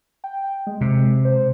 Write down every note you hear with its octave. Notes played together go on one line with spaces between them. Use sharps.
G5
G#3
C3
C5